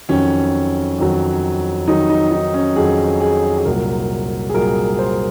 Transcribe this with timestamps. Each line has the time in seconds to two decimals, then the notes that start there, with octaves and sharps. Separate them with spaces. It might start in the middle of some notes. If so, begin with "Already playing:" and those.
0.09 F2 D#3 F#3 C#4
0.98 F2 D#3 F#3
1.87 F2 D#3 F#3 D#4
2.09 D#4
2.31 D#4
2.54 C#4
2.76 F2 D#3 F#3 G#4
3.20 G#4
3.58 G#4
3.65 C2 A#2 F#3 A#4
4.49 G#4
4.54 C2 A#2 F#3 A#4
4.99 C5